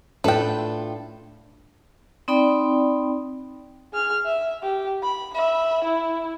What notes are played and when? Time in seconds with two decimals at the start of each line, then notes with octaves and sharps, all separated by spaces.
0.24 A2 D4 F4 A4 B4 G5
2.28 C4 D#4 D5 G5 B5
3.93 G#4 F6
4.26 E5
4.63 G4
5.03 B5
5.34 E5 B5
5.84 E4